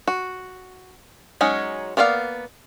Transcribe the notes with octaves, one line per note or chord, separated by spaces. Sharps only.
F#4
F#3 G#3 C#4 D#4
A#3 B3 D5 D#5 F5